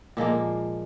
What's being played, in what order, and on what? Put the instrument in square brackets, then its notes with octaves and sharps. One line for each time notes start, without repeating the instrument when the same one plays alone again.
[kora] A#2 F3 G#3 A#3